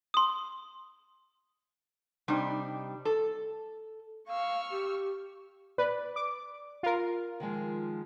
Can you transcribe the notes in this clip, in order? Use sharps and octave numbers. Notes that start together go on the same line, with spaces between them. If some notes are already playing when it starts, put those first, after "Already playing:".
C6 D#6
C3 G3 D4 D#4
A4
F5 C#6 E6 F6
G4
B4 D5
D6
F4 A#4
D#3 F3 G#3